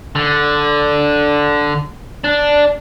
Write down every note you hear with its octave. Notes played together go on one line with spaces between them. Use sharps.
D3
D4